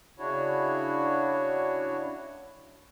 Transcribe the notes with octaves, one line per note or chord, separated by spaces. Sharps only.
C#3 D4 E4 F#4 C#5